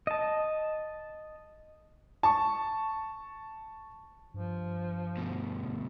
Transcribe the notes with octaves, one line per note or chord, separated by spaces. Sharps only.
D#5 A5
A5 C#6
G2 F3
D2 B2